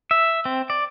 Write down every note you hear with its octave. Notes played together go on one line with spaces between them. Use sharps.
E5
C4
D5